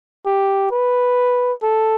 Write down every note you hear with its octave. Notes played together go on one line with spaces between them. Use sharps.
G4
B4
A4